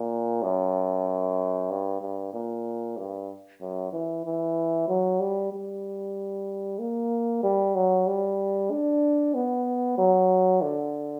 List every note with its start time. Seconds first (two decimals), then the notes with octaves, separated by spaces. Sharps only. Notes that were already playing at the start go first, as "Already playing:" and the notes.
Already playing: A#2
0.43 F#2
1.70 G2
2.02 G2
2.34 A#2
2.97 G2
3.61 F#2
3.93 E3
4.25 E3
4.88 F#3
5.20 G3
5.53 G3
6.79 A#3
7.43 G3
7.75 F#3
8.07 G3
8.71 D4
9.35 B3
9.98 F#3
10.62 D3